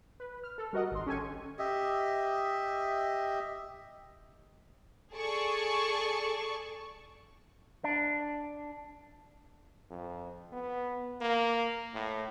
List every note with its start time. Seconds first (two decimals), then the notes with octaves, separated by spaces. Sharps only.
0.20 B4
0.44 F6
0.58 A4
0.73 G3 F#4 A#4 D#5 F#5
0.92 G#1 C6
1.06 C#4 G4 A4 G#5 C#6
1.59 G4 D#5 E5
5.15 G#4 A4 D5 A5 C#6
7.84 D4
9.90 F2
10.52 B3
11.21 A#3
11.94 A2